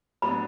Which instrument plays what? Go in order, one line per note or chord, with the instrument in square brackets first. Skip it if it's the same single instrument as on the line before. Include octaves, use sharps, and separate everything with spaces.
[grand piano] A2 F#3 B3 D4 [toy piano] B5